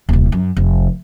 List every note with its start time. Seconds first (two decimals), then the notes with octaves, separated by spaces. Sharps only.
0.09 D#1 C2
0.32 F#2
0.57 F1